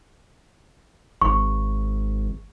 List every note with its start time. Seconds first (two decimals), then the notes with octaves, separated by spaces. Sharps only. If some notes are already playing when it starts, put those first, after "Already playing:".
1.22 G#1 C#6